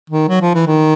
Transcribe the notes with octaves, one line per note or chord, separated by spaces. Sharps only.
D#3
F#3
F3
E3
D#3